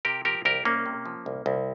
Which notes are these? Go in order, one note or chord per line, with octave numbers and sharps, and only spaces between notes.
C3 G4 A#4
F3 G4 A#4
C2 G4 A#4
C2 A#3 C#4
C3
F3
C2
C2